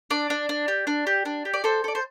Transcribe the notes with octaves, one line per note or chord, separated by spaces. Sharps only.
D4 D5
D4
D4
G4
D4
G4
D4
G4
D5
A4 C5
A4 D5
C5